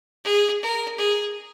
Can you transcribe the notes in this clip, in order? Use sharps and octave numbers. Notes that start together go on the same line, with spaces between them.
G#4
A#4
G#4